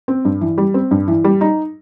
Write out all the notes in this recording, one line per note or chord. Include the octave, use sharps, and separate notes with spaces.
C4
G2
E3
G3
C4
G2
E3
G3
D#4